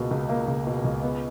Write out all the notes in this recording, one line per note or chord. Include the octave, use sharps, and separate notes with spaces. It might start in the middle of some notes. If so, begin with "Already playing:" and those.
Already playing: C#2 B2 A#3
C#2
A#3
C#2
B2
C#2
B3